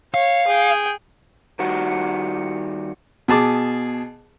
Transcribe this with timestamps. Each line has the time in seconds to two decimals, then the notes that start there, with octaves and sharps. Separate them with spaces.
0.14 C#5 F5
0.48 G#4 G5
1.59 D#3 G3 F#4
3.28 B2 G#4 A5 D6